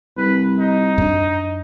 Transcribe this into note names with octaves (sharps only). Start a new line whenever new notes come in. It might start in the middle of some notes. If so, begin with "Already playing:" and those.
C2 B4
D#4
F#2 D4